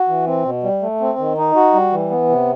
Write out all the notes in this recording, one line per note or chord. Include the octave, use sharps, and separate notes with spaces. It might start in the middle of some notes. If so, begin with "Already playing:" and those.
Already playing: F#4
E3
C4
B2
G3
A3
C4
D#3
D#4
F#4
G3
E3
B3
C3